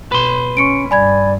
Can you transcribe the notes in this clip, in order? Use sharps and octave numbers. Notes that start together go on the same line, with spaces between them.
B2 B4 C6
C#4 C#6 C#7 D7
G2 D5 G#5 B5 G#6